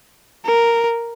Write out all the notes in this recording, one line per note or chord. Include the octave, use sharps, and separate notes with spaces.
A#4